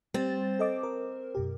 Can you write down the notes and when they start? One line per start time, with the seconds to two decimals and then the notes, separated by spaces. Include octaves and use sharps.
0.14 G3 C4 C5 A6
0.59 A4 D#5 D6
0.83 A#4
1.35 F#2 B2 G4